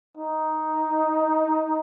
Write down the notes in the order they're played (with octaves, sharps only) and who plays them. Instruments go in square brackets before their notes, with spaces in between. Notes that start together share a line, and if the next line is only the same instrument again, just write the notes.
[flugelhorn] D#4